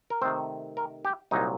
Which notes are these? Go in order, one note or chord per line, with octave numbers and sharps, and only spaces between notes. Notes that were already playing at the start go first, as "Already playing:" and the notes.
A#4
C3 D#3 A3 C4 C5
A#4
G4
C2 A#2 F#3 D#4